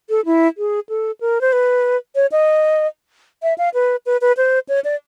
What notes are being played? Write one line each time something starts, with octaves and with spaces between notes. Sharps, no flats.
A4
E4
G#4
A4
A#4
C5
B4
C#5
D#5
E5
F5
B4
B4
B4
C5
C#5
D5